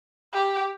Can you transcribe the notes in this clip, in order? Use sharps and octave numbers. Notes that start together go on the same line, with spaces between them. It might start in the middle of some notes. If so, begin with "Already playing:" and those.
G4